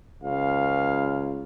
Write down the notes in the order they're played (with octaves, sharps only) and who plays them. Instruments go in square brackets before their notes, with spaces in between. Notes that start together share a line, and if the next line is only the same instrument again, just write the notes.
[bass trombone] C#2 [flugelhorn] F5